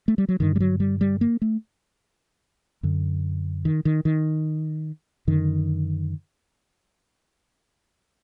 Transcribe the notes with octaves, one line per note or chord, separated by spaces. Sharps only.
A3
G3
F#3
G2 D3 D#3
G3
F#3
G3
G3
A#3
A3
F#2 D3
D#3
D#3
D#3
F#2 D3 D#3